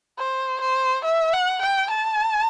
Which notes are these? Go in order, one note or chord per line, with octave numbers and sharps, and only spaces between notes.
C5
C5
E5
F#5
G5
A5